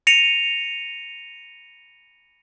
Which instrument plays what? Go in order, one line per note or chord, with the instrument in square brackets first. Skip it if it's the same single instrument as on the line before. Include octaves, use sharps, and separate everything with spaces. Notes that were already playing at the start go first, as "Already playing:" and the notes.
[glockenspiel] A#6 C#7 D#7 F7